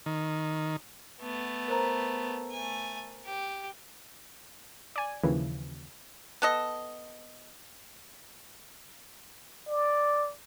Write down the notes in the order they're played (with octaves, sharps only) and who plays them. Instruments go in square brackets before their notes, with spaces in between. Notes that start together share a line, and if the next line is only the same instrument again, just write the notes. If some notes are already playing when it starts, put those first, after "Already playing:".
[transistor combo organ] D#3
[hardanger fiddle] A3 B3
[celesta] A#4 C5 A#5
[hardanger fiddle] A3 G#5
G4
[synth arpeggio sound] D5 G#5
D#2 C#3 E3 F3
[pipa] B3 A4 D#5
[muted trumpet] D5